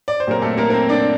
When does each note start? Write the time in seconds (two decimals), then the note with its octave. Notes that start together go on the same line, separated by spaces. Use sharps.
0.08 D5
0.20 C5
0.27 A#2 F#3 C4 A#4
0.42 A3 A4
0.58 A#3 A#4
0.70 A#4
0.73 C4 C5
0.89 D4 D5